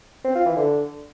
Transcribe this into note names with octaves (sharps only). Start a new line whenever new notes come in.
C4
F4
E3
D3